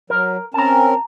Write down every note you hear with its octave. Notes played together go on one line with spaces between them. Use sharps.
F#3 A#4
C4 C#4 A#4 A5 A#5